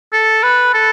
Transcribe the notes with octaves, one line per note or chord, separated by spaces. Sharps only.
A4
B4
A4